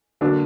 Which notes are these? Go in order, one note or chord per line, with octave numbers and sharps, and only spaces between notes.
D3 F#3 A#3 D4